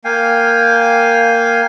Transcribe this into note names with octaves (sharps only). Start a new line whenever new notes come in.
A#3 F5 G5 G#5